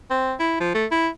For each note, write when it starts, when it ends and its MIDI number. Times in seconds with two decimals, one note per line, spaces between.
0.11 0.34 60
0.40 0.57 64
0.60 0.74 53
0.74 0.86 57
0.91 1.08 64